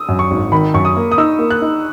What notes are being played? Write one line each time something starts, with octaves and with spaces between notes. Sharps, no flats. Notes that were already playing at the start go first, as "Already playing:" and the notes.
Already playing: D#6 E6
F#2
C#6
G#1
D#3 B5
F#2 C#6
D#6
A#3
D#6
D#4 E6
A#3
F#6
D#4